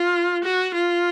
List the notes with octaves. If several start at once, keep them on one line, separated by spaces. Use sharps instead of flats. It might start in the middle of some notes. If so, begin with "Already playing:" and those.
Already playing: F4
F#4
F4